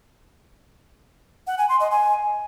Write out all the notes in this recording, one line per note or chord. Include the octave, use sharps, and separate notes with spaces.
F#5
G#5
C6
D#5
G#5